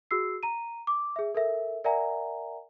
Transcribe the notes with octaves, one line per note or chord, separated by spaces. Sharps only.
F#4 G#4 E6 C7
A#5 D#7
D6
G#4 E5
A4 A#4 E5
A#4 D5 E5 F#5 G#5 A#5